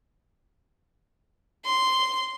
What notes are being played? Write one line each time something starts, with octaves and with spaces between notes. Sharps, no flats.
C6